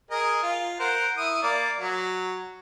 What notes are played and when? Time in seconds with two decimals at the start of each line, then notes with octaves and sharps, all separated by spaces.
0.11 G#4 A#4 D#5
0.43 F4
0.79 A#4 C5 F#5
1.17 E4 D#6
1.43 A#3 D5
1.80 F#3